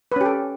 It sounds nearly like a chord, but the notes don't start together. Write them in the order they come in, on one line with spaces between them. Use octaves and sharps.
B4 C#4 G4 A4